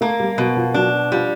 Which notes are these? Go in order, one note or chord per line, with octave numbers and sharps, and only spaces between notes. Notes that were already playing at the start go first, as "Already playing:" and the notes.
A3 A#3
G3
B2 F#3
F3
F#3 D4
F3 G3